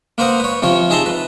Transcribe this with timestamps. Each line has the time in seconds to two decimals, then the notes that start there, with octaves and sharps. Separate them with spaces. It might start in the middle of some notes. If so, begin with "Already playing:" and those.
0.18 A#3 B4 C5 F#5 A#5 D#6
0.40 B4 C#5
0.62 C3 F3 F4 C#5
0.90 D#4 G#4 E5 A5 A#5 C6
1.06 B4